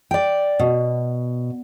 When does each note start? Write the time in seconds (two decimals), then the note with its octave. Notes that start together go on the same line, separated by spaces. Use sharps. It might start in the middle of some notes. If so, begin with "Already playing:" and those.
0.11 D5 G5
0.59 B2